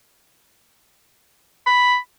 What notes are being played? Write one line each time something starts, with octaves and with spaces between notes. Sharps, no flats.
B5